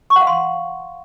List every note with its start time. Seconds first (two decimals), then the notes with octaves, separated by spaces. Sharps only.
0.10 C#6
0.16 F#5
0.21 F5
0.27 C6